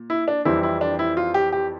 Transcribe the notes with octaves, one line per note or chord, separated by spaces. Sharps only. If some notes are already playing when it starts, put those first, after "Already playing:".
Already playing: A#2
E4
D4
F2 E3 G3 C4 E4
E4
D4
E4
F4
G4
G4